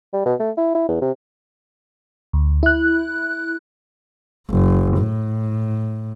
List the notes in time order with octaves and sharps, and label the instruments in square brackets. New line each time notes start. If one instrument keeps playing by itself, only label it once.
[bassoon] G3
B2
A3
E4
E4
E2
C3
[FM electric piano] D2
E4 F#6
[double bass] F#1
A2